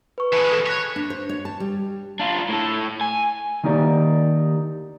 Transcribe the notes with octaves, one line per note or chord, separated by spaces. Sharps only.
B4 C#6
E3 G#3 A5 C#7
A4 B5 E7
C#5 F#6 A#6 B6
D4
C5
C#5
A5
G3
D4 F4
A2 A4
G#5
D#3 A#3 D#4 G4 D5